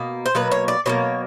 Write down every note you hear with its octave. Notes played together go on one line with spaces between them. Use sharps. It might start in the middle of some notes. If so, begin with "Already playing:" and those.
Already playing: B2 A#3
C5
B2 F#3 A#3 B4
C#5
D5
B2 F#3 A#3 C#5